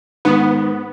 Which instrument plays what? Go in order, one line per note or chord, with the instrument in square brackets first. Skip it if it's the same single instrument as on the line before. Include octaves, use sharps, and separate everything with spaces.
[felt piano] G#2 D#3 [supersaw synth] B3